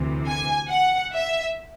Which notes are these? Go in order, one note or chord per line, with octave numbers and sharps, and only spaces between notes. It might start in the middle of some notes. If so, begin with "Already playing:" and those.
Already playing: D2 C3 E3
G#5
F#5
E5